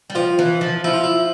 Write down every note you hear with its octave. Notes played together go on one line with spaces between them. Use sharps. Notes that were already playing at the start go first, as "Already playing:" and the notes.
G3
F3 F4
E3
F3
F3 E4
F4
E4